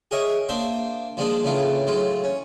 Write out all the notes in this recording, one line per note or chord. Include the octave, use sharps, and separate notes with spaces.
G4 G#4 A#4 C#5 D#5 E5
A#3 D4 C5 E5 G5 C6
F3 G3 G#3 A#3 D4 D#4
A2 C#3 E3 D4 F4
A2 F#3 G#3 F4
C#4